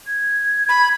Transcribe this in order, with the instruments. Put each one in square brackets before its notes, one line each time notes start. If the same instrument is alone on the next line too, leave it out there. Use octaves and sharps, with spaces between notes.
[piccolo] G#6
[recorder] B5